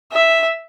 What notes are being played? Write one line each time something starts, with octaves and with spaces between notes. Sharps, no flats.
E5